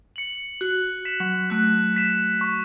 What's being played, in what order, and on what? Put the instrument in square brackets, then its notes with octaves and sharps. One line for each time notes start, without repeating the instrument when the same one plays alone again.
[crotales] C#7 F#7
[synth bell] F#4 [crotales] F#6
[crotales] B6 E7
[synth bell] F#3
[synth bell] A3 [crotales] F#6
[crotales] B6 E7
C#6